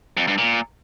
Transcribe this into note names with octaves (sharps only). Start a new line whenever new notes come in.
F2
G2
A#2